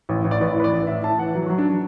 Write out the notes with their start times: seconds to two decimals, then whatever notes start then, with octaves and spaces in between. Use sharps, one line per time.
0.09 A1
0.25 A1
0.31 D5
0.41 A1 B4
0.56 E3 B4
0.64 D5
0.73 A1
0.87 A2 E5
1.04 A2 A5
1.19 E3 F#5
1.35 F#3
1.46 F#4
1.50 F#3
1.58 D4
1.69 D4